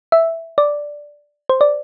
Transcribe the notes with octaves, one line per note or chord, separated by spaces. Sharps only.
E5
D5
C5
D5